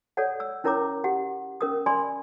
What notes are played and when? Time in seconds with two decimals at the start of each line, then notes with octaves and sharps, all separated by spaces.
0.17 A4 C#5 D5 F#5
0.40 E6
0.64 C#4 E4 A#4 C#5 A#5 D6
1.04 G4 F#5
1.61 C#4 A#4 D#6
1.86 D5 G#5 B5 C6